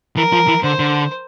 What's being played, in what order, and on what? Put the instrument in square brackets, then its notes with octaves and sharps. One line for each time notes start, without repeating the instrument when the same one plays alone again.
[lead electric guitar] E3 [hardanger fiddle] A#4
[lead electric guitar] F3
E3
[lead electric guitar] D3 [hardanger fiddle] C5
[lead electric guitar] D3